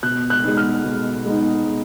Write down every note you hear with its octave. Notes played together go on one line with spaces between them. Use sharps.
B2 F#6
F#6
G#3 B3 D#4
F6
B2
G#3 B3 D#4